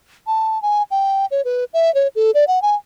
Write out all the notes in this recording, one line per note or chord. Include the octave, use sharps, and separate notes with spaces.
A5
G#5
G5
C#5
B4
E5
C#5
A4
D5
F#5
G#5